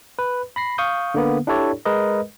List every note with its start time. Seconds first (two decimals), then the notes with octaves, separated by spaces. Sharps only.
0.19 B4
0.56 B5 A#6 C7
0.78 F5 C#6 D#6 G6
1.14 D3 A#3 B3
1.47 D4 E4 G4 A4 C#5 D5
1.85 G#3 A#4 B4 D#5